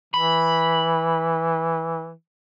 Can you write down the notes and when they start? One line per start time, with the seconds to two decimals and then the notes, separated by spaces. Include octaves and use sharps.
0.14 E3 B5